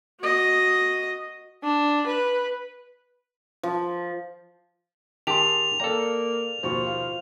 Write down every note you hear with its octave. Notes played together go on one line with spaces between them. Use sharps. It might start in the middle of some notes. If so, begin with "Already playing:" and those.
F#4 D#5
D4
B4
F3
D#3 G4 G#4 A5 C6 F7
A#3 A4 D5 F5 G5 A#5
D#2 B2 F3 C#6
F5